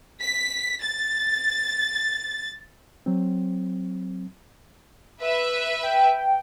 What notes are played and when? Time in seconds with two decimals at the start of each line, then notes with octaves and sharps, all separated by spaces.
0.19 B6
0.81 A6
3.06 F#3 C4
5.21 B4 E5
5.83 G5